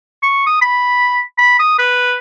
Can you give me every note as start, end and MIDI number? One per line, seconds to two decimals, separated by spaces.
0.23 0.45 85
0.46 0.59 87
0.61 1.19 83
1.38 1.55 83
1.59 1.76 87
1.79 2.17 71